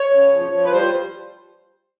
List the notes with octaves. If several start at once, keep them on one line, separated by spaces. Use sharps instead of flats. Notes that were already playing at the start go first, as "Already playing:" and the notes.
Already playing: C#5
C#3
F3
F3
B4
G3 C5